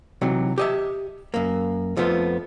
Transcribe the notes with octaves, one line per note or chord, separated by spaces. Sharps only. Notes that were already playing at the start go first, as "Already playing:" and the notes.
C3 E3 F#3 D#4
G4 D#5 E5
F#2 A#3
F2 F3 A3 B3 F4